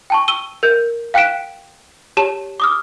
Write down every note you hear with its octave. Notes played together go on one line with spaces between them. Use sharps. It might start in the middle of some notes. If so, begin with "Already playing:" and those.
G5 A5 C#6
E6 D#7 G7
A#4 G6
F5 G5 F#6 B6 D7 E7
G4 C#5 A5 E7
D6 D#6 F6